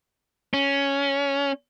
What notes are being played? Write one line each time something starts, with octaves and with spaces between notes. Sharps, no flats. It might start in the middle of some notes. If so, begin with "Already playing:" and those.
C#4